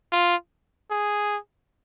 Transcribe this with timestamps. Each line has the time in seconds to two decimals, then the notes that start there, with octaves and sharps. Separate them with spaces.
0.12 F4
0.91 G#4